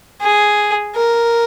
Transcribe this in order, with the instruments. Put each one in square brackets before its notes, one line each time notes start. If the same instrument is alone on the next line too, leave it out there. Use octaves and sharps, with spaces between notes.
[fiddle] G#4
A#4